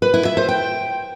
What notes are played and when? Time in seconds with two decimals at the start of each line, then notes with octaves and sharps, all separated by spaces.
0.02 B4
0.14 E4
0.25 E5
0.37 C5
0.49 G5